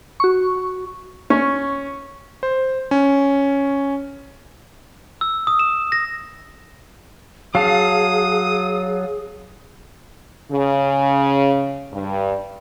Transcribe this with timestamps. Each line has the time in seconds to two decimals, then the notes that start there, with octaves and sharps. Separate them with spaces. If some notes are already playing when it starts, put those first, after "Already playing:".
0.20 F#4 C#6
1.30 C#4 C#6
2.43 C5
2.91 C#4
5.21 E6
5.47 D#6
5.59 E7
5.92 A#6
7.55 F#3 G#4 F5 A5 D#6
10.51 C#3
11.91 G2